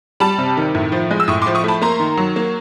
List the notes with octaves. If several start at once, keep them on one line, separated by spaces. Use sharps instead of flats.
G3 A5 B5
C3
D#3
A2
F3
G#3
E6
A2 C#6 D#6
C6 D6
F3
C#6 D#6
A3 A5 B5
A#3 A#5 C6
D#3
F#3
A#3